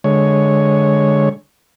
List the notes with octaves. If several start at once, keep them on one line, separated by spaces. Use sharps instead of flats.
D3 G#3 C#5